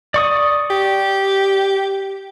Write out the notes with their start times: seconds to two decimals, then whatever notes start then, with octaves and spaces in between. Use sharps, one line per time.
0.14 D5 C#6 D#6
0.70 G4